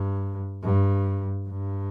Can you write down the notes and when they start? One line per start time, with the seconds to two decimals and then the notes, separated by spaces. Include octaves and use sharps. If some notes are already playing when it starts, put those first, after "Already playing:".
Already playing: G2
0.63 G2
1.49 G2